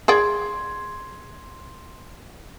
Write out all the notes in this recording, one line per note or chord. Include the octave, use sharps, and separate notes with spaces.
G#4 D5 G5 C6 G#6